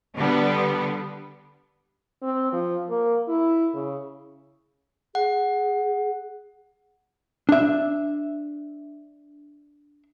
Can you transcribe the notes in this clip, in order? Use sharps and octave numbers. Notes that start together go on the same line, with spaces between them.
D3 G3 B3
C4
F3
A#3
E4
C#3
G#4 F#5
D4 E5